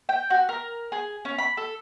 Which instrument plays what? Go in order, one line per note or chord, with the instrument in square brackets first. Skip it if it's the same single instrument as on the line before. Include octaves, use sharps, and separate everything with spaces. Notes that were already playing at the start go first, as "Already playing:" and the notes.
[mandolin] G5
F#4
A#4
G#4
C#4
B5
A4